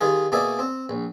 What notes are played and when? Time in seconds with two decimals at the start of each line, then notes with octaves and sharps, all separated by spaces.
0.01 D#3 G3 F4 G#4
0.32 B2 A#3 G#4 D5 E5
0.59 C4
0.89 A#1